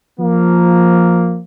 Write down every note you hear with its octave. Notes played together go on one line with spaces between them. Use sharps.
F3 A#3